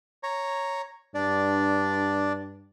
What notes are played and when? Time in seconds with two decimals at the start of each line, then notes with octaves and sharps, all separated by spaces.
0.23 C#5 A#5
1.15 G2 D4 D5